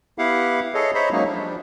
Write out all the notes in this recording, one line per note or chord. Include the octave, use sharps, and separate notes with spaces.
B3 E4 G4 F5 F#5
G#4 A4 C#5 D#5
C5 C#5 D#5 E5 A#5 B5
F#3 G#3 A#3 C#4 D#4
F3 G3 D4